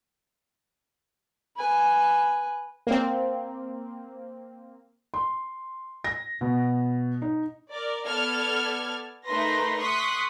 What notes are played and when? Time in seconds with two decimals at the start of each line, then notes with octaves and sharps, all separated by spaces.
1.56 B4 G#5
2.87 A#3 C4
5.14 C6
6.04 A#6
6.41 B2
7.22 D#4
7.70 A#4 D5
8.07 B3 A4 D5 F6 G#6
9.26 A3 D#4 A#4 B4 C6 A#6
9.79 C6 C#6 D#6 F#6 B6